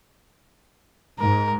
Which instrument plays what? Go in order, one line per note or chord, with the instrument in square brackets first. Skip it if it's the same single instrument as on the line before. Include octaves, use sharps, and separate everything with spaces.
[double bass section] G#2 [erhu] A#4